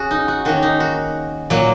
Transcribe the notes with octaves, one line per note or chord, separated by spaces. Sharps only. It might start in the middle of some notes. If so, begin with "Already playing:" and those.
Already playing: C#4 F#4 G#4 C#5
D#4
F#4
D#3 A#3 C#4 F#4
D#4
F#4
A#2 F#3 A#3